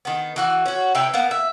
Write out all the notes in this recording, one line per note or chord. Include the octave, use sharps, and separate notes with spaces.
D#3 B3
E3 F#4 F#5
C#4 F#4
C3 E4 B4 G5
A#3 B3
E5